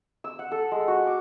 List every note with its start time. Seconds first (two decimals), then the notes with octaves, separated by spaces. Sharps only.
0.24 E6
0.39 F#5
0.51 A4
0.71 G#3
0.88 F#4
1.07 D6